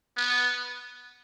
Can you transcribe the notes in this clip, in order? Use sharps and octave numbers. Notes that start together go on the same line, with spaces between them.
B3